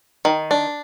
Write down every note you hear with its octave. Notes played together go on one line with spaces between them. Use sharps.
D#3
D4